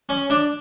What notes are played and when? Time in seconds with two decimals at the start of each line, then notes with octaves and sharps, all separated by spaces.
0.09 C#4
0.30 D4